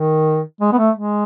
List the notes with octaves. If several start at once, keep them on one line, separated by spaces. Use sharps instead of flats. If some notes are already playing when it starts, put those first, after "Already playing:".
Already playing: D#3
G#3
B3
A3
G#3